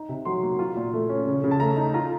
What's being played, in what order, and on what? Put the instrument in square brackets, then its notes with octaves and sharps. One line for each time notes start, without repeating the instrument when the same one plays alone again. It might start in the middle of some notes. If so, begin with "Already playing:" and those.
Already playing: [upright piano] D#4
C3
F#3 C6
A#3
F4
A#2
A3
C#4
C#3
C#3
A5
A3 A#5
D#4
F4 A#5